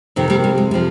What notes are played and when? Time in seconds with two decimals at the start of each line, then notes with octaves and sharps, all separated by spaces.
0.16 F2 C3 D#3
0.30 G3 A#3
0.44 G3
0.58 G#3
0.71 C3 F3 G3